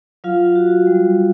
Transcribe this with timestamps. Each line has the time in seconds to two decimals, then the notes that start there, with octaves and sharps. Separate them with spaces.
0.24 F#3 F4 F5
0.56 F#4
0.87 G3